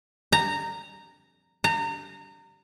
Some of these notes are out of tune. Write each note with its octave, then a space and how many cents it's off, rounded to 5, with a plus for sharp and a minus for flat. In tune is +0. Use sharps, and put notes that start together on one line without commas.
A#5 -15
A#5 -30